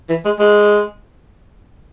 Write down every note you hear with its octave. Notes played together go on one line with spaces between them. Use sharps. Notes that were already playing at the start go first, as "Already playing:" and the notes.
E3
G#3
G#3